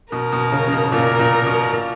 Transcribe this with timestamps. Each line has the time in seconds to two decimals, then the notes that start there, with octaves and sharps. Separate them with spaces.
0.12 B2 A#4
0.32 B2
0.52 C#3
0.68 C#3
0.72 B2
0.92 A#2 A#4
1.19 A#2
1.46 B2
1.72 A#2